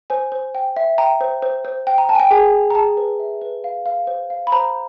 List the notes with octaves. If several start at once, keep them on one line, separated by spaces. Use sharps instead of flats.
C5 G#5
C5
G5
E5
G5 A#5
C5
C5
C5
G5
A#5
G5 A5
G#5
G5
G#4 G#5
G#4
A#5
G#4 A5
B4
E5
B4
F5
F5
C5
F5
B5
C5 A#5